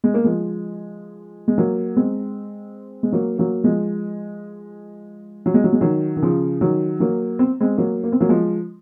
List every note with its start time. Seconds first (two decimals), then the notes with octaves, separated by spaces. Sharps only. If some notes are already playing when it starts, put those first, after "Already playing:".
0.04 G#3
0.14 A#3
0.24 F3 G#3
1.48 G#3
1.58 F#3 A#3
1.96 G#3 C4
3.03 G#3
3.12 F#3 A#3
3.38 F#3 A#3
3.64 F3 G#3
5.46 F#3
5.54 G#3
5.64 F#3
5.73 G#3
5.81 D#3 F#3
6.17 D#3
6.22 C#3 F3
6.61 D#3 F#3
7.00 F#3 A#3
7.39 C4
7.60 G#3 C4
7.77 F#3 A#3
8.04 A#3
8.12 C4
8.20 F#3 A#3
8.29 F3 G#3